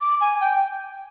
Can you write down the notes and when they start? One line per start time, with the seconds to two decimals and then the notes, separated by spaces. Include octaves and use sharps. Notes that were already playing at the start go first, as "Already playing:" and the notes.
0.01 D6
0.21 G#5
0.41 G5